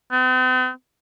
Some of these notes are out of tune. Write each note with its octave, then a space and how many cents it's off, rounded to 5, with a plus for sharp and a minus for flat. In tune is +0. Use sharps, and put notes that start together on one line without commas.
C4 -45